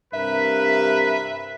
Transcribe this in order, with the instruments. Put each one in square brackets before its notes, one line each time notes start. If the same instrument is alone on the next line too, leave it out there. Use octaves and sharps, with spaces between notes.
[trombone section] G2 C3 A#4 [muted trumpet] B4 [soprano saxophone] E5